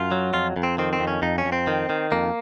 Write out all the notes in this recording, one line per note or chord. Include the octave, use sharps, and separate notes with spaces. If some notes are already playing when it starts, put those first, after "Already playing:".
Already playing: F#2 F4
F#3
F2 F4
F2
C4
D#3 C4
C4
F2
C#4
F2 D#4
C#4
F2
C4
D#3
D#3
F2 A#3